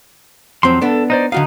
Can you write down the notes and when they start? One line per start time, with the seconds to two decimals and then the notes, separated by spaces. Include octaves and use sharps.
0.63 F2 F#3 C4 C6
0.82 B3 D4 A4
1.10 D#4 C5 D5
1.32 D3 D#4 F#4 F5